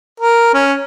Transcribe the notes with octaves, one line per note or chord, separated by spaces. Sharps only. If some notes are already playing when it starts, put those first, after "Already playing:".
A#4
C#4